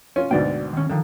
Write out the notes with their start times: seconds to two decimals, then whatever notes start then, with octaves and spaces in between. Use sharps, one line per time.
0.16 C#4 F4
0.31 D2 G#2 B2 D5 G5
0.73 D#3 C#4
0.90 D3 D#3 F3